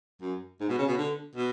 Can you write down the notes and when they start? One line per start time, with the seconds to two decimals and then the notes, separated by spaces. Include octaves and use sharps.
0.22 F#2
0.61 G#2
0.69 B2
0.79 C#3
0.88 B2
0.98 D3
1.36 B2